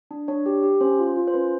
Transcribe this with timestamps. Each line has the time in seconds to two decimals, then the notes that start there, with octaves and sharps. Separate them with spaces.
0.11 D4
0.28 D4 C#5
0.46 G4
0.63 G4
0.81 C#4 C5
0.99 F4
1.16 F4
1.28 C5
1.34 C#4 B4